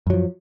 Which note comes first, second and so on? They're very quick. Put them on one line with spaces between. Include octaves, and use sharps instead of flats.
F#2 F#3 F3